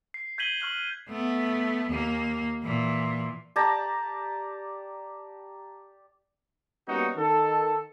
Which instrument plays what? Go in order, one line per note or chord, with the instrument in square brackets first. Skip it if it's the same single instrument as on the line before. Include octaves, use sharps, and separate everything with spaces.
[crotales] C7
G6 G#6 B6 D#7 F#7 G7
C#6 F6 F#6 F#7
[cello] A3 B3
D#2 A#3
A#2 E3
[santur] G4 D5 A5 A#5
[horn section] G3 A#3 B3 C#4 D#4 F#4
D#3 A4